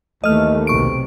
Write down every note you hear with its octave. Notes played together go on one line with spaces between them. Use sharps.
D#2 E3 A3 D#5 F6
B1 C3 C#6 D7